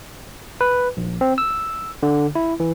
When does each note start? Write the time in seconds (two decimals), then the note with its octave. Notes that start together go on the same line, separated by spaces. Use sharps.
0.61 B4
0.97 A#1
1.21 C4
1.38 E6
2.03 D3
2.35 E4
2.60 E3